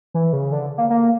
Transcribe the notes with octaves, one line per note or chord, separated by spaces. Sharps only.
E3
C#3
D3
A#3
A#3